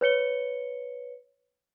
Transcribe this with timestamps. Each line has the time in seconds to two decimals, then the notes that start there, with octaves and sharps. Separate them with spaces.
0.01 B4 C#5 C#7 G7